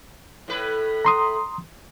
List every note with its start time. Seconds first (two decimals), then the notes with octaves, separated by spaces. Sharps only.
0.48 A2 B4
1.05 A#5 C6 D#6